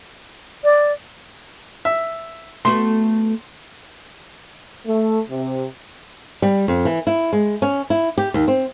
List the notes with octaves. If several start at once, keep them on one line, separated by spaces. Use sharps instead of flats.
D5
E5
A3 B3 F#4 C6
A3
C3
G3
F2
E3
E4
G#3
C#4
E4
G4
D#2
C4